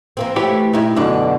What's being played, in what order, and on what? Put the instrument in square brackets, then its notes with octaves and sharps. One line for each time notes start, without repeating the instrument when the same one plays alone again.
[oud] E3 A#3 C4
[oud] E3 A3 [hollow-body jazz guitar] E4 G4 C#5
[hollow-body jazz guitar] A#2 [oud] D#4 E4 G4
[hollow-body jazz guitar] B1 F#2 D4 [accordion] B2 D3